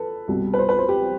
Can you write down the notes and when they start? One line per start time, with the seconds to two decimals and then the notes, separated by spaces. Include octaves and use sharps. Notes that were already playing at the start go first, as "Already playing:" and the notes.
Already playing: A4 B4
0.28 C2 B2 G3
0.54 B4
0.59 C5
0.69 B4
0.79 C5
0.89 G4